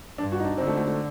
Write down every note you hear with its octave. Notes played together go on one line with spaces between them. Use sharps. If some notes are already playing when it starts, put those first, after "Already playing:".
G2 D4
F#4
D#4
D4
D3 C4
A3
A3
A3